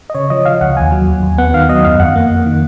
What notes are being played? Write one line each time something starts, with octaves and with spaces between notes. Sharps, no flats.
D#5
C#3 C#5
F3 D#5
F3 F5
C#2 F#5
D#2 G#5
F#3
D#2
D#2
B3 F#5
D#3 F5
F#3 D#5
F#2 F5
F2 F#5
A#3
F2
D#3